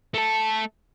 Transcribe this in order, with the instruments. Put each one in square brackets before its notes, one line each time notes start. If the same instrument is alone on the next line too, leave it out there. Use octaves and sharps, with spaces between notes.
[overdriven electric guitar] A3 A4